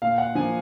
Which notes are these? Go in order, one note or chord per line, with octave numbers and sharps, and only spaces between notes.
A#2 F5
F#5
F3 A#3 G#5